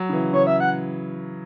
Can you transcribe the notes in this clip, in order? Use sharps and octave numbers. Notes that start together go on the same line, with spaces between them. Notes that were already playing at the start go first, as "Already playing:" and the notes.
Already playing: F#3
C#3
E3
C#3 C#5
E5
F#5